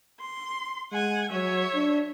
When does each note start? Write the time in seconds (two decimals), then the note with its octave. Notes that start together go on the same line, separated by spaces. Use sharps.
0.20 C6
0.92 G#3 F#5 G#5
1.31 F#3 C#5 E5
1.74 D4